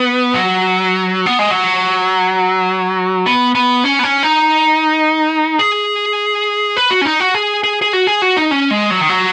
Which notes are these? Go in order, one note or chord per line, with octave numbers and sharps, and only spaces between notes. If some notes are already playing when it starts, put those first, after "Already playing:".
Already playing: B3
F#3
B3
G#3
F#3
B3
B3
C#4
B3
C#4
D#4
G#4
B4
F#4
C#4
D#4
F#4
G#4
G#4
G#4
F#4
G#4
F#4
D#4
C#4
G#3
F#3
D#3
F#3